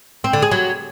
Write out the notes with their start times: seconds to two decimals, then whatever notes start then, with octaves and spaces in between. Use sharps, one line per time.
0.24 C4
0.33 D3
0.42 G#4
0.51 F#3